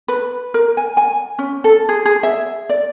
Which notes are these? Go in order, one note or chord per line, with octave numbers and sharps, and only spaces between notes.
B4
A#4
G#5
G#5
C#4
A4
G#4
G#4
E5
D5